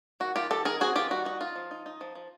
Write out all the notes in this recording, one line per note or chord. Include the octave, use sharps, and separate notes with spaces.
D#3 F#4
D#3 F4 G4
D#3 G4 A4
D#4 G#4 A#4
C4 F#4 G#4
D#3 F4 G4
G3 F#4
D#4 F#4
D#4 F4
F3
D#4
D#4
F3
F3